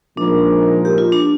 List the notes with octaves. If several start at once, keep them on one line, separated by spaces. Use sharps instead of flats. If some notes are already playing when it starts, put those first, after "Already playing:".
A#2 F3 G#3 D4 D#4 A#4
G4
F4
D4